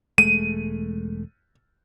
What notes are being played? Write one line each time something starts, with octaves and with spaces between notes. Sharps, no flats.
E1 G#3 A3 D#7